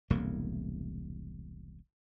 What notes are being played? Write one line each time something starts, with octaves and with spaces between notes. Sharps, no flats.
E1 C2 A2 A#3